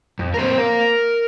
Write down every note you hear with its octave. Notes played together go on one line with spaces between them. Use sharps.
F2
A#4
F3 A#3 C4 C5
A#3 A#4